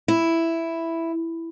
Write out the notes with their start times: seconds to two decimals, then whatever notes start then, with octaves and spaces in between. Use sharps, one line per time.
0.08 E4